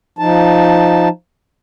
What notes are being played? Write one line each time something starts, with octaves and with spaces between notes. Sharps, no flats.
F3 D#4 A5